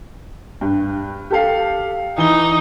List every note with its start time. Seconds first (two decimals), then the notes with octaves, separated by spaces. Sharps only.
0.61 G2
1.31 G4 A4 F5
2.18 E3 D#4 G7